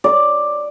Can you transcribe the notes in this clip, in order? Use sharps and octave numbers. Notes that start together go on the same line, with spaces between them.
D5